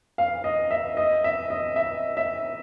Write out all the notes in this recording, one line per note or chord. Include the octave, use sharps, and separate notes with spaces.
F5
D#5
E5
D#5
E5
D#5
E5
E5